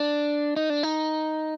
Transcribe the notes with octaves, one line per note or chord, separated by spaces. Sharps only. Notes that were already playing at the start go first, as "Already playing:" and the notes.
Already playing: D4
D#4
D4
D#4